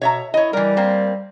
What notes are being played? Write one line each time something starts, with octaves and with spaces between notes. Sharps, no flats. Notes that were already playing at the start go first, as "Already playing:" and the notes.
B2 C#5 E5 A#5
E4 C#5 D#5
E3 G3 A#4
A#3 C4